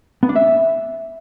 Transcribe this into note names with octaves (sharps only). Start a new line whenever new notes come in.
B3
D4
E5